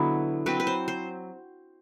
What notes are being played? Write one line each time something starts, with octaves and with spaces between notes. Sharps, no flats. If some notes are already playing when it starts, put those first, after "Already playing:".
Already playing: B2 D3 F#3 B3 E4
F#3 C4 B4
B4
C5
C5